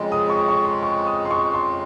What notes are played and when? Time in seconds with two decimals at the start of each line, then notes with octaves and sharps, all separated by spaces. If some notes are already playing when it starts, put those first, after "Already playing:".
Already playing: F2 C#3 G#3
0.12 D#6
0.30 C#6
0.48 C#6
0.65 C6
0.83 C#6
1.07 D#6
1.25 C6
1.31 C#6
1.54 C6